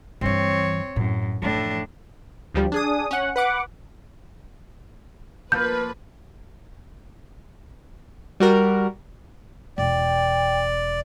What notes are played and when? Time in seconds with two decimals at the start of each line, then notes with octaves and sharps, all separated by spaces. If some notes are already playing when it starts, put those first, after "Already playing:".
0.21 G2 E3 C4 C#5
0.96 F#2 A2
1.42 A2 E3 F3 D4
2.54 D2 F3 G3
2.72 D4 G#4 D#6
3.11 C#4 F#5
3.36 B4 F#5 D6
5.52 F3 A#3 F4 B4 G6
8.40 G3 F#4 A#4
9.78 E1 D5 G5